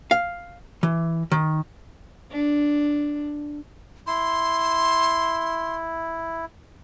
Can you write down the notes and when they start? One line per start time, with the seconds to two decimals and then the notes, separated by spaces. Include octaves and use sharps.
0.11 F5
0.83 E3
1.32 D#3
2.32 D4
4.07 E4 C6